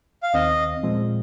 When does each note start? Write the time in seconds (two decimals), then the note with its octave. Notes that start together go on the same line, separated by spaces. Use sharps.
0.23 F5
0.34 D#2 D#3 C4 D#5
0.83 A#2 F3 G#3 C4